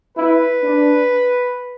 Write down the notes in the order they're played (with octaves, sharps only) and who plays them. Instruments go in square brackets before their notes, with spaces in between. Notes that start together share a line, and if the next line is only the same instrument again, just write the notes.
[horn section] E4 [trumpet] B4
[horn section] D4